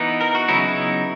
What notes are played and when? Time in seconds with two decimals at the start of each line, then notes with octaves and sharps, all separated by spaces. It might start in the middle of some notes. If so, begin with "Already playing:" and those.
Already playing: E3 B3 D#4
0.21 A#4
0.35 F#4
0.48 C#3 F#3 B3 D#4 E4
0.68 E4